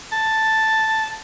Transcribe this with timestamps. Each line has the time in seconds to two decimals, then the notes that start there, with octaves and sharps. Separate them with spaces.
0.12 A5